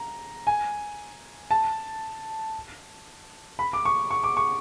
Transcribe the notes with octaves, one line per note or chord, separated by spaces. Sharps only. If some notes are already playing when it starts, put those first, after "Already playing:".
Already playing: A#5
G#5
A5
B5
D6
C#6
C#6
D6
C#6